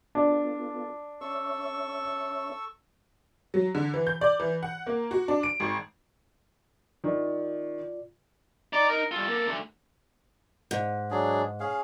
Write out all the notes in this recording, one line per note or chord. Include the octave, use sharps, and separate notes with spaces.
B3 D4 F4 A4
C#4 A4 C#5 E5 C#6 E6
F#3
D3
E3
G6
D5
E3
F#5
A#3
F#4
D4
D7
G#1
D#3 F4 D5
D#4 D5 A#5
A#4
G3 F4 A4
A#3
D3 A3
G#2
F#3 D4 G#4
C#4 G#4 F5